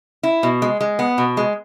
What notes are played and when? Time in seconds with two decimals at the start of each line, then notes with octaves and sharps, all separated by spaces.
0.23 E4
0.43 B2
0.62 G#3
0.81 G#3
0.99 B3
1.18 B2
1.37 G#3